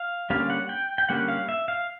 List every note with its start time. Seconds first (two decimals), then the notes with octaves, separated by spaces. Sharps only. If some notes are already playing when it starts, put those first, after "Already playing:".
Already playing: F5
0.30 D3 G3 A#3 C#4 F5
0.50 F#5
0.69 G5
0.98 G5
1.09 D3 G3 A#3 C#4 F#5
1.28 F5
1.49 E5
1.68 F5